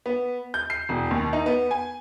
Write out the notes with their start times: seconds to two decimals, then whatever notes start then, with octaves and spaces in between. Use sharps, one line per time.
0.06 B3
0.54 G6
0.70 C7
0.89 E1
1.11 D#2
1.33 D#4
1.46 B3
1.71 G#5